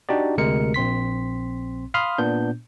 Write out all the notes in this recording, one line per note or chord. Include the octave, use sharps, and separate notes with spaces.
D4 D#4 F#4 G4 D5
D2 C3 G#3 A#4 C#7
A#1 C4 C6 B6
F5 B5 C6 D#6 F6
A#2 B3 D4 G6